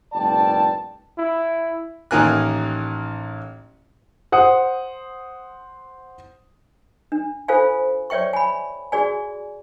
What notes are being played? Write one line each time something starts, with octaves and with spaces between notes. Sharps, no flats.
F#1 G#2 B2 D5 G5 A5
E4
A1 D#3 A#3 A#4 G#5 F#6
C5 F#5 D#6
D4
F4 A4 C5 F5 G#5
C#5 D5 E5 G5 C#6
G#5 B5
F#4 G#4 D5 G#5